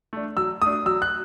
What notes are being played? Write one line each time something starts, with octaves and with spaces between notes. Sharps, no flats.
A3 D4
F#3 E6
A3 D4 D#6
F#3 E6
F#6